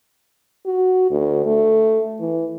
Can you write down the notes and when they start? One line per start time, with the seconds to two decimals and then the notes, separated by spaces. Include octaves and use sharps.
0.66 F#4
1.11 D2
1.46 A3
2.20 E3